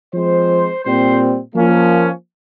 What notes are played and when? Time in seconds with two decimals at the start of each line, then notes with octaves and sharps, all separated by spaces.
0.14 F3 G#3 C4 C5
0.84 A#2 G3 C4 C5
1.54 F3 A#3 C#4